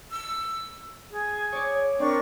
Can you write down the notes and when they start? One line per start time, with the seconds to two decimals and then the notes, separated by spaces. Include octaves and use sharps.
0.10 E6
1.13 G#4
1.52 C#5 D5
1.99 C4 D4 A#4 C#6